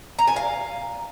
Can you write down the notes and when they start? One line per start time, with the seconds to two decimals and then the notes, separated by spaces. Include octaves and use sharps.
0.19 A#5
0.27 G#5
0.36 F5